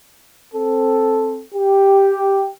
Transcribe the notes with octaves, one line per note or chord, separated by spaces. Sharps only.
C4 A4
G4